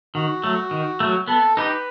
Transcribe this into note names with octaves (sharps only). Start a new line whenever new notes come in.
D#3 F#4
F#3 A3
D#3
F#3 A3
B3 A4
D#4 G4 B4